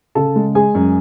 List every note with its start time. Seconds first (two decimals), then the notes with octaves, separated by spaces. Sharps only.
0.15 C#3 A4 A5
0.36 G#3
0.55 G#3 G#4 G#5
0.75 F#2